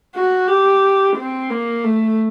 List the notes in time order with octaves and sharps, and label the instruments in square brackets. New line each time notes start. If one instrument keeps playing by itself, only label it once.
[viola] F#4
G4
C4
A#3
A3